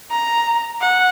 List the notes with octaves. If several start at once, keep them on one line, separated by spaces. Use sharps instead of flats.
A#5
F#5